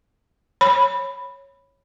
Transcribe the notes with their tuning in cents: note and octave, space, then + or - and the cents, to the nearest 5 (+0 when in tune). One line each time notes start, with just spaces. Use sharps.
C#5 -10 B5 +0